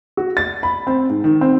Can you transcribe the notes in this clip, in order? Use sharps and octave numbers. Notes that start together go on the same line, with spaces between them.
F#4
A6
B5
C4
G#2
D#3
C4